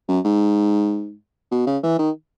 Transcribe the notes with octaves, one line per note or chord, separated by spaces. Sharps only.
F#2
G#2
B2
C#3
E3
D#3